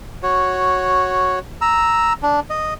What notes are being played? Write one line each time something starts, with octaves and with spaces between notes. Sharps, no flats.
F#4 C#5
A#5 E6
D4
D#5